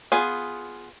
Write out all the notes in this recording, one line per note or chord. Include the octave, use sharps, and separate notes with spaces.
B3 F4 G#4